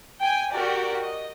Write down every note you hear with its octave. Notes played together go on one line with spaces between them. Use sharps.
G5 G#5
F#4 G4 A#4 D5
D#5